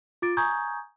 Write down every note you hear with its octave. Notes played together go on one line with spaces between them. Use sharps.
F4 D6 A6 D7
G#5 A#5 C#6 D#6 G6 G#6